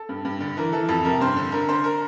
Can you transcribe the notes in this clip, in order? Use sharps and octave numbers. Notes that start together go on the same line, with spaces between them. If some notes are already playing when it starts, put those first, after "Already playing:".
Already playing: A4
G2
G2
D3
E3 A#4
E3 A4
F2 A4
C3 A#4
G2 C5
D3
D3 A#4
D3 C5
A#4